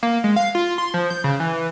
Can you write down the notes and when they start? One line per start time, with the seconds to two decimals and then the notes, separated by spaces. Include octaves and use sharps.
0.03 A#3
0.24 G#3
0.36 F5
0.55 F4
0.78 C6
0.94 F3
1.10 G6
1.24 C#3
1.40 E3